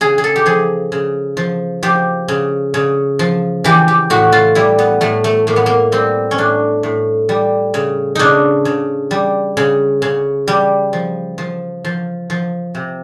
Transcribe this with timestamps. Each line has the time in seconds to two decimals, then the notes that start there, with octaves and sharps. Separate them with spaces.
0.01 C#3 G#4
0.18 G#4
0.24 A4
0.36 G4
0.46 F3 G#4
0.92 C#3
1.37 F3
1.83 F3 G4
2.28 C#3
2.74 C#3
3.19 F3
3.64 E3 G4
3.88 G4
4.10 A2 F#4
4.32 F4
4.55 G3 E4
4.79 B3
5.01 A2 A3
5.24 A3
5.47 A2 A#3
5.56 B3
5.66 A#3
5.92 G3 C4
6.31 C#4
6.38 A2 D4
6.83 A2
7.29 G3
7.74 C#3
8.15 C#3 D4 D#4
8.65 C#3
9.11 G3
9.57 C#3
10.02 C#3
10.48 G3
10.93 F3
11.38 F3
11.85 F3
12.30 F3
12.75 C3